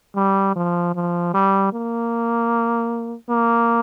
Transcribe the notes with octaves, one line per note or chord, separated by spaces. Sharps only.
G3
F3
F3
G3
A#3
A#3